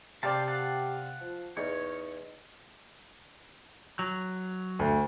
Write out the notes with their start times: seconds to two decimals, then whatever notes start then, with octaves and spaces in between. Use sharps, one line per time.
0.23 C3 G4 C5 D5 F5 A5
0.48 F5 F#5 A5
1.21 F3
1.57 E2 D#4 C#5
3.99 F#3
4.79 D2